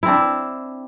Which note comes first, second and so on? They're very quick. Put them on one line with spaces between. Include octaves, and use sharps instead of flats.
E4 C4 D4